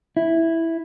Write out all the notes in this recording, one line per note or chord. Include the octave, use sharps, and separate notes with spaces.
E4